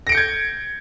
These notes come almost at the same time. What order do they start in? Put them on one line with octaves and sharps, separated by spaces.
A#6 D7 C#7 G6 G#6